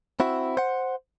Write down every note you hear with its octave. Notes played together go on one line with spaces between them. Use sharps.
C4 E4 F#4
C5 F#5